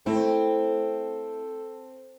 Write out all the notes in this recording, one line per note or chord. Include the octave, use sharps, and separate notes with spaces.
A3 C4 E4 A4